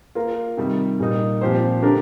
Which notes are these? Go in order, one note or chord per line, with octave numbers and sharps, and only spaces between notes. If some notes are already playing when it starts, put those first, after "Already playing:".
A#3 F4 A#4
C3 D#3 G3
A#2 G3 A#3 D#4
A#2 F3 C4 G4 C5
D3 A3 D4 G4 A#4